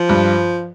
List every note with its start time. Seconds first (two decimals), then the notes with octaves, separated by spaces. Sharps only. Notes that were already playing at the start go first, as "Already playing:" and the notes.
Already playing: F3
0.09 G2